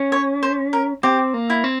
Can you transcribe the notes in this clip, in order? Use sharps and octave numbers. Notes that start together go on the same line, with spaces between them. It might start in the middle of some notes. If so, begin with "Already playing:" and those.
Already playing: C#4
C#5
C5
A#4
C4 G4
A#3
E4
C4